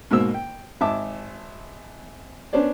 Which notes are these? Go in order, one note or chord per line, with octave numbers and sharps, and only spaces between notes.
G#2 B2 A#3 A#4 C5 E6
G5
G#1 E5 A5 D6
B3 C#4 D4 C5 D5